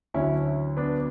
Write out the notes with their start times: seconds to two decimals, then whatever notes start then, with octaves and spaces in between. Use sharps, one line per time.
0.14 D2 D3 F#3 C#4 E4
0.77 B3 D4